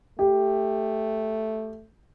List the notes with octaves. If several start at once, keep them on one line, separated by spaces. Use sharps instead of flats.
A3 G4